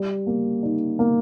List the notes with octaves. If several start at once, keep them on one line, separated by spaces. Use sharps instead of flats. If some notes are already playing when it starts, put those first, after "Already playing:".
Already playing: G3
A#3
D#4
A#3